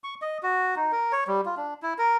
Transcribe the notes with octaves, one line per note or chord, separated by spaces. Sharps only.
C#6
D#5
F#4
D#4
A#4
C#5
G3
F4
D4
E4
A#4